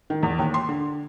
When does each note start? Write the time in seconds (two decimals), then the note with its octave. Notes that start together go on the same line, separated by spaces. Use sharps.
0.10 D#3
0.23 E2
0.39 D#2
0.54 C6
0.69 D3